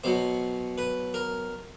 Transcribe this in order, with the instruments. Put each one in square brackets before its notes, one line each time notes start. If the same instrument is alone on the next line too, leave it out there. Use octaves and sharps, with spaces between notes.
[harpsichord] B2 F#3 C5
B4
A#4